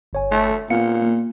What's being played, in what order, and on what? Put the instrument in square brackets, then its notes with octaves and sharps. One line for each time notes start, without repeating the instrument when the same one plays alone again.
[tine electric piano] G1 C#5 G#5
[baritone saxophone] A3
[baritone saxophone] A#2 [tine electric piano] B3 F5 C#7
[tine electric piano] A#3